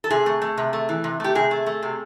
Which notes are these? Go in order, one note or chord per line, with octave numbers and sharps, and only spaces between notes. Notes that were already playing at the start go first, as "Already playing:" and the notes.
A4
C3 G#4
A3
A3
C3
A3
E3
C3
A3 G4
C3 G#4
A3
A3
C3